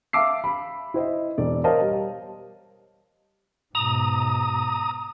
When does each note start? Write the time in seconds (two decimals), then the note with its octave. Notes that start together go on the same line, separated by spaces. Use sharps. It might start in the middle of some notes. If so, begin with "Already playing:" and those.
0.13 E5 F5 A5 D6 E6 C7
0.44 B5
0.94 E4 C5 D#5 E5
1.38 E1 D5
1.64 A#4 C5 C#5 D#5 F5 A5
1.81 G3
3.75 G#2 B2 A#5 D#6